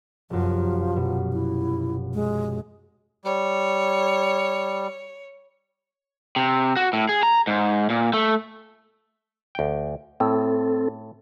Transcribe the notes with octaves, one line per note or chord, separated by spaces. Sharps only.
F1 F#2 F3
B2
E4
G#3
G3 C#5
C3
F#4
A2
G#4
A#5
G#2
A#2
A3
D2 G5
A2 C4 A4